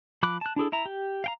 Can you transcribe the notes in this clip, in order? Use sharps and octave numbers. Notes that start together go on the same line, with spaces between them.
F3 B5 D6 F#6
A5 F#6
D4 E4 G#4 A4
E4 E5 A#5
G4
F5 G5 A#5